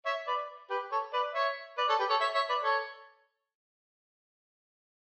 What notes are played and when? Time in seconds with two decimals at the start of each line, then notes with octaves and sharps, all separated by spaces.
0.06 C#5 E5
0.27 B4 D5
0.70 G4 B4
0.92 A4 C#5
1.13 B4 D5
1.35 C#5 E5
1.77 B4 D5
1.88 A4 C#5
1.99 G4 B4
2.10 A4 C#5
2.21 C#5 E5
2.35 C#5 E5
2.49 B4 D5
2.63 A4 C#5